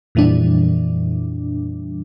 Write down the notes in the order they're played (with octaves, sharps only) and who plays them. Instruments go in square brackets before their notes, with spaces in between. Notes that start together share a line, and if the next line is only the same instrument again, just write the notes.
[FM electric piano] F2 A#2 E3 G3 D4